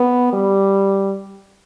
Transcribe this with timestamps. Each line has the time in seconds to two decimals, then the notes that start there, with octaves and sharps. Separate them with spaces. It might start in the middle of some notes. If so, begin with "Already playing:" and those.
Already playing: B3
0.33 G3